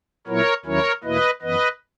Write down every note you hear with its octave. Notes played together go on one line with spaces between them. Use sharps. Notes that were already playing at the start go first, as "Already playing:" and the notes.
A#2 F#3 B3 E4 A#4 C#5
D#2 D#3 F#3 C#4 E4 A#4 C#5
E2 B2 A#3 E4 B4 D#5
F#2 E3 B3 B4 D#5